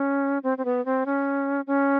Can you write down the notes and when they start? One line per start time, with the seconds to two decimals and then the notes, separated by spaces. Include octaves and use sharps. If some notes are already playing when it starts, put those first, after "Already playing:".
Already playing: C#4
0.43 C4
0.58 C4
0.65 B3
0.85 C4
1.06 C#4
1.67 C#4